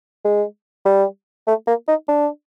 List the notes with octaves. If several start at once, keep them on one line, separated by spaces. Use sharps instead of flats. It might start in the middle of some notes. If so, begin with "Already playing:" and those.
G#3
G3
A3
A#3
D#4
D4